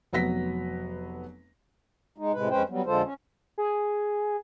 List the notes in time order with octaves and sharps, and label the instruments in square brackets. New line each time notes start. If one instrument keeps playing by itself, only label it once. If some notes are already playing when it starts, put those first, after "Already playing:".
[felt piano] F1 F#3 B3 A#6 B6
[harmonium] G#3 D#4
A2 C3 G#3 B4
F2 G#3 C#4 B4 C5 G5
F#3 G3 B3
F2 D3 G#3 F4 A4 C5
C#4
[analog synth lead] G#4